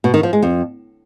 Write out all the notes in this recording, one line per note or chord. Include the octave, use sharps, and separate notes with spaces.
B2
D#3
F3
G#3
F2